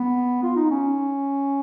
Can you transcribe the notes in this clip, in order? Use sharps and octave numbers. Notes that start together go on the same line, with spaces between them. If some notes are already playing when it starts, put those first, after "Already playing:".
Already playing: B3
F4
D#4
C#4